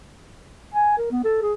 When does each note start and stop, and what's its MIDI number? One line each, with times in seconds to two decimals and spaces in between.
0.74 0.96 80
0.98 1.09 70
1.11 1.20 59
1.24 1.38 69
1.42 1.53 68